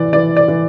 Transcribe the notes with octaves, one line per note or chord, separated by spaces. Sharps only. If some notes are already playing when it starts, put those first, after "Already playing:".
Already playing: E3 D5
E3 D5
D5
E3